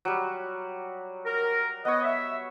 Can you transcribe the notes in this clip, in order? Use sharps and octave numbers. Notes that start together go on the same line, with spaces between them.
F#3 G3
A#4
B3 C#5 D#5
E5